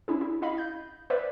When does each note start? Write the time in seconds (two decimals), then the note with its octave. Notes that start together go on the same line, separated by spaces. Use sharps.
0.08 C#4 D4 E4 G#4
0.21 E4
0.42 E4 D#5 F5 B5
0.58 G6
1.10 B4 C5 D5 E5